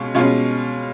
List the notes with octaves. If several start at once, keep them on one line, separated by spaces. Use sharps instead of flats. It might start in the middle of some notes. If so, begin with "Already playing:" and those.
Already playing: B2 G#3 C#4 F4
B2 G#3 C#4 F4